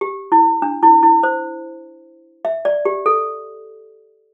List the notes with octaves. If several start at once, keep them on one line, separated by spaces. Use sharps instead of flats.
G4
E4
D4
E4
E4
C5
E5
D5
G4
A4